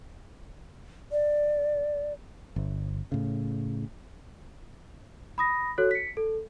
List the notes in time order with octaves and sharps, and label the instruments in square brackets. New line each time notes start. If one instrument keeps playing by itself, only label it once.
[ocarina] D5
[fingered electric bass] G1
A2 C#3
[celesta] B5 D#6 A#6
F#4 A4 C#5 F#6
B6 C#7
A4